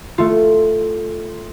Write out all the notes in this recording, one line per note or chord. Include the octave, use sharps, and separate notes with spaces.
A3 F4